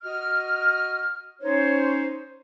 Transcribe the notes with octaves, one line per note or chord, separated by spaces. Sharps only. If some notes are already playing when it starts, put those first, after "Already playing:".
F#4 D#5 F6
C#4 D#4 C5 C#5